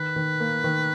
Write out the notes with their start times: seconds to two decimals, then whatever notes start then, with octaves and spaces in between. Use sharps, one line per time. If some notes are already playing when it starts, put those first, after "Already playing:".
Already playing: D#3 B4
0.16 D#3
0.40 A#3
0.64 D#3